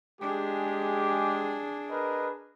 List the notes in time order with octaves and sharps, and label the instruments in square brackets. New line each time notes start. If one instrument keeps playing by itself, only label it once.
[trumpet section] G#3 G4 [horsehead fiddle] D4 G#4
[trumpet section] A#4 B4 D#5